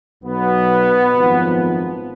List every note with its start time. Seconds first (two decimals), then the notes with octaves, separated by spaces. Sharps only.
0.23 B1 B2 F#3 B3
1.13 G#1 F#2 F3